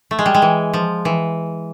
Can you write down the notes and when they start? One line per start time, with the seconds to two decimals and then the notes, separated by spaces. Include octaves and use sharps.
0.11 A3
0.19 G#3
0.26 G3
0.34 G#3
0.42 E3
0.74 F3
1.05 E3